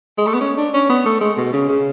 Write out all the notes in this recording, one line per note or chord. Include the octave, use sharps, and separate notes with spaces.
G#3
A3
B3
C#4
D4
C#4
B3
A3
G#3
B2
C#3
C#3